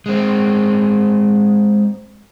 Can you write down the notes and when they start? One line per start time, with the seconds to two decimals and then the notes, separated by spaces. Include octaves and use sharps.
0.06 G#3 C4